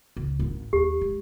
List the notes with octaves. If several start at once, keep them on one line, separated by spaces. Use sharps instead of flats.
C#2
G#1 D4
D#2 G4
G#3